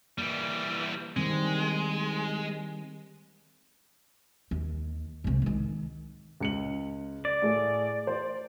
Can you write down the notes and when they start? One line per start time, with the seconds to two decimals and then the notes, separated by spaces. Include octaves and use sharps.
0.18 E3 G3 A#3
1.16 D#3 G3 G#3 C4
4.51 D#2
5.24 C2 G#2
5.42 D#3 G#3
6.40 C#2 C#7 F#7
7.25 D5
7.42 A2 G#4
8.07 C5